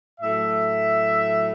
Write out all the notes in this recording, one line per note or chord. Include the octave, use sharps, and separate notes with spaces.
A2 F#3 A3 E5